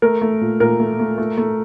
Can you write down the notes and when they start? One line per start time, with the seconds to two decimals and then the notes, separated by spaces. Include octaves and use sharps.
0.02 A3 A#4
0.22 A3
0.41 A#2
0.60 A#2 A#4
0.80 A3
0.99 A3
1.18 A3
1.38 A3